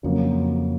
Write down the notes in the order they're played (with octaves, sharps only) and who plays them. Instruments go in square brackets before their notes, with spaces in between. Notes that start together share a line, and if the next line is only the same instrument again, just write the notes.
[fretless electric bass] F2 [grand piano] C#3 F#3 A#3